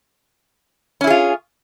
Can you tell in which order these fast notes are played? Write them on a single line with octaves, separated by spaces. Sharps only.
C#4 E4 G#4 F4